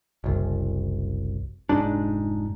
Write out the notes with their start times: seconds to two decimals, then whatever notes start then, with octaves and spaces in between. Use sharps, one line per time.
0.24 F#1 C2
1.69 F1 G#2 D4